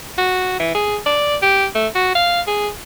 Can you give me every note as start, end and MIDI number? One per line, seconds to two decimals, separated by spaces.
0.18 0.56 66
0.60 0.70 52
0.75 0.98 68
1.06 1.36 74
1.42 1.66 67
1.75 1.87 57
1.95 2.11 66
2.15 2.41 77
2.47 2.69 68